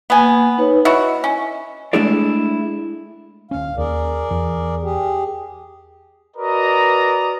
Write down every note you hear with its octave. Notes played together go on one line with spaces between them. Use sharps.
A#3 B3 G#5
D#4 B4 C#5
E4 F#4 D#5
C#4
G#3 A3 D4 E4 G#4 D5
D1 C#4 F5
D#2 G#4 A#4 D5
E2
G4 G#4
F#4 A#4 B4 D5 D#5 A#5